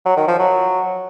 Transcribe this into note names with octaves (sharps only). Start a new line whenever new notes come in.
F#3
D#3
F3
F#3